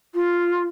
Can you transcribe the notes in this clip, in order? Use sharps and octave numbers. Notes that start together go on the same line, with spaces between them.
F4